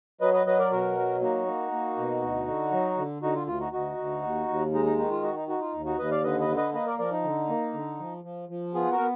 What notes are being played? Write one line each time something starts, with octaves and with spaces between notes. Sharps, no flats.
F#3 B4 D#5
B4 D#5
F#3 B4 D#5
A#4 D5
B2 F#4 A#4
F#3
A#3 D#4 F#4
A#3
A#3
B2
D2
D3
F#3
D3
D3 D#4 F#4
F4
D2 F4
D#4 F#4
D2 D#4 F#4
D2
D#2
D#2
G#3 D#4
D#4
D#3 D#4
F4
D#4 F#4
D#4
D#4 F#4
F4
D#2
D#4 F#4
D#2 B4 D#5
D5 F5
D3 B4 D#5
B4 D#5
D3
B4 D#5
A#3 B4 D#5
A#4 D5
F3 A#4 D5
D#4
D3
A#3
D3
F3
F3
F3
B3 F4 G#4
F#4 A#4
B3